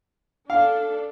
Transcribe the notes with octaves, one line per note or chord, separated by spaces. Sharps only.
D4 A4 F5